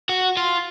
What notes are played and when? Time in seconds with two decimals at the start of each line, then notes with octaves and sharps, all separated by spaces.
0.09 F#4
0.37 F4